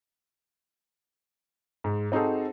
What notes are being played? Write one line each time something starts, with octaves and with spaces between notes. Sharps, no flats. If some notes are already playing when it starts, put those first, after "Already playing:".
G#2
C4 D#4 F#4 G#4 A4